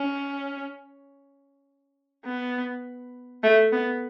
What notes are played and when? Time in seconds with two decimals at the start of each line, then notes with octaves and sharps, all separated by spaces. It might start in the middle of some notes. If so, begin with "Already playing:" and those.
Already playing: C#4
2.25 B3
3.43 A3
3.72 B3